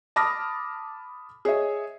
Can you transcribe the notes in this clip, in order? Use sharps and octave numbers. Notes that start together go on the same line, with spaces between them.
A5 B5 D6 D#6 F6 A#6
G#4 C#5 D#5 E5